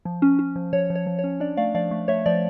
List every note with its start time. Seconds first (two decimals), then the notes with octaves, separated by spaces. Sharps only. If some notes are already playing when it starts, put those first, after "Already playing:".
0.05 F3
0.22 C#4
0.39 C#4
0.56 F3
0.73 F3 C#5
0.90 F3
0.95 C#5
1.06 F3
1.19 C#5
1.24 C#4
1.40 D4 D5
1.57 A3 D5 F5
1.75 F3 D5 F5
1.91 A3
2.08 A3 C#5 E5
2.26 F3 D5